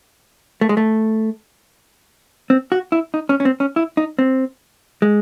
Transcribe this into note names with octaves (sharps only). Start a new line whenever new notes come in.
A3
G#3
A3
C4
F#4
E4
D#4
C#4
C#4
C4
C#4
E4
D#4
C4
G#3